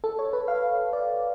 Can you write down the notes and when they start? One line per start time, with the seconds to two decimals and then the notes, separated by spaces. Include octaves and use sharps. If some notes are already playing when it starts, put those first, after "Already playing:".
0.04 A4
0.19 C#5
0.33 B4
0.48 F5
0.93 D5